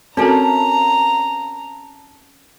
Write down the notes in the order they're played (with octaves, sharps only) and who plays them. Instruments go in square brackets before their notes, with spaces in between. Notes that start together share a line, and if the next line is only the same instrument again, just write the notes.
[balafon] C4 F#4 A4 [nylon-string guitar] C#4 A#4 [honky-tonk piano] A5 [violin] A#5